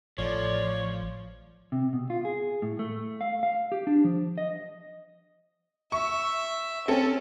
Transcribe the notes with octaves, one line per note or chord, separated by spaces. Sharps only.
A1 F3 A4 C#5 D5
C3
B2
F4
G#4
A2
A3
F5
F5
G4
D4
F3
D#5
E5 C#6
C4 C#4 A4